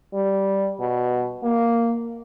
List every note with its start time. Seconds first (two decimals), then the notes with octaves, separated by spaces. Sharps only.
0.14 G3
0.80 B2
1.44 A#3